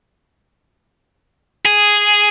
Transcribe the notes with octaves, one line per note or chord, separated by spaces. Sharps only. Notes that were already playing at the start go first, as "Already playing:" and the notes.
G#4